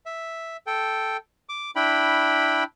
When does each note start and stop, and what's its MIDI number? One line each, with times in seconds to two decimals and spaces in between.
0.06 0.57 76
0.67 1.17 69
0.67 1.17 79
1.49 1.71 86
1.76 2.64 62
1.76 2.64 64
1.76 2.64 79
1.76 2.64 83